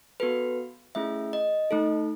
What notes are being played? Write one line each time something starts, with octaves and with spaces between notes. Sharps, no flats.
B3 F#4 A4 B4
A3 C#4 E4 G#4 E5
D#5
A3 D#4 A4